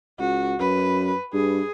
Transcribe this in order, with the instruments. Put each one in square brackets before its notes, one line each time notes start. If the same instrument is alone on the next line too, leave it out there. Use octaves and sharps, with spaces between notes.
[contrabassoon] C#2 [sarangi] F#4
[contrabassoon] F#2 [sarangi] B4
[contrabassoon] G2 [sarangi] G#4